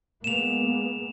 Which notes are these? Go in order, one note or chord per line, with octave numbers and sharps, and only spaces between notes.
G#3 A#3 B3 E7 F7